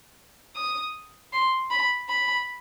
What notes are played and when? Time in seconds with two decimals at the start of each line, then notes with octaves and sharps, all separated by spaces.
0.55 D#6
1.33 C6
1.71 B5
2.09 B5